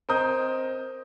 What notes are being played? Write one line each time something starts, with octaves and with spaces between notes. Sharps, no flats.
C4 A#4 D#5 D#6 G6